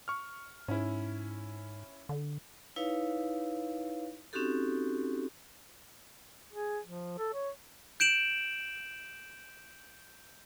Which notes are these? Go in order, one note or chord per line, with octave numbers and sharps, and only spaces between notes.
C#6 F6
G#2 C#4 E4
D3
D#4 E4 B4 C#5 F5
C4 C#4 D#4 F#4 G4 A4
G#4
F3
A4
C#5
G6 D7 E7 F#7